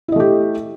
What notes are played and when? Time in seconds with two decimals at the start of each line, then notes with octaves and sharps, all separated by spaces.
0.08 E4
0.12 D#5
0.16 A3
0.20 G4